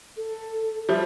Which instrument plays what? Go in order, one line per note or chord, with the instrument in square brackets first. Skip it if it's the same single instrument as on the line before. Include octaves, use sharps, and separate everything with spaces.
[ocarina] A4
[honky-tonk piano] F3 G3 [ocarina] E5